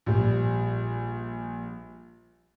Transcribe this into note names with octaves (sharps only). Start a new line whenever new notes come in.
A#1 G3